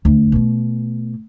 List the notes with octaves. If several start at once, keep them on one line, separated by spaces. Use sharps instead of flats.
D2
B2 A3